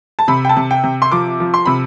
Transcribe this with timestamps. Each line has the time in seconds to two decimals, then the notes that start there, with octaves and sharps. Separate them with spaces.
0.19 A5
0.28 C3 B5
0.45 G5
0.49 A5
0.56 C3
0.71 G5
0.83 C3
1.02 C6
1.12 F3 D6
1.40 F3
1.54 C6
1.65 C3 B5